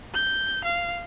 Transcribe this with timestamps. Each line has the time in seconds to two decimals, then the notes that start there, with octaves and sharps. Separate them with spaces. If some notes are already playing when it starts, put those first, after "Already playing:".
0.14 G6
0.64 F5